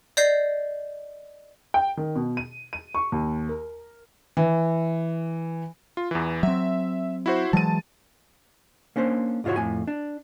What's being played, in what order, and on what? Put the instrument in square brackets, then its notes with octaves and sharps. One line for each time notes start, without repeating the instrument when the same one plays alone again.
[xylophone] D5 D#5 G6 C7
[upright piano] G5
D#3
B2
D#7
D#7
C#6
D#2
A#4
[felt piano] E3
[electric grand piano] F4
E2 E3
[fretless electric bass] F#3 C4 [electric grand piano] E5
[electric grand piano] E4 F#4 C5
[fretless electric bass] E3 F#3 G#3 [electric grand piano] A5 D#7
[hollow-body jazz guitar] A#3 C#4 D4 C5
C2 G#2 F4 F#4 C#5
F2 A2 G#5
D4